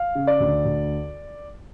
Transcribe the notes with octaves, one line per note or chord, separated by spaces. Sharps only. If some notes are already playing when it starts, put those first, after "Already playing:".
Already playing: F5
C#3
D5
D2
D2